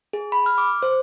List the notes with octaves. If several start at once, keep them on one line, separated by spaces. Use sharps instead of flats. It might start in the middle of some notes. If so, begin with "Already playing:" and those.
G#4
B5
F6
D6
C5